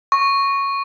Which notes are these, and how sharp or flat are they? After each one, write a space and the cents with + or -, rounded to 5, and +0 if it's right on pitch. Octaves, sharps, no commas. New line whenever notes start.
C#6 -5